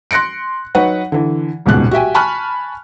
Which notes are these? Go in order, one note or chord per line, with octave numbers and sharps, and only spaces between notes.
C6 F#6 A#6 C#7 D7
F#3 D#4 F#4 B4 F#5
D3 E3
D#1 C#2 G#2 B2 F#6
F#4 G4 E5 G5 G#5
G#5 A5 B5 C#6 F6 F#6